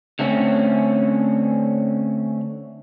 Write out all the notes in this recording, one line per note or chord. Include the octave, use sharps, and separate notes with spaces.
D3 A3 C4 C#4